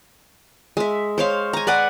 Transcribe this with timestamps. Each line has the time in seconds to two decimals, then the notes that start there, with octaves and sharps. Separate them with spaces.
0.77 G#3 E5
1.18 C5 C#5 F5
1.53 G#5 A#5
1.67 B4 D5 F#5 G#5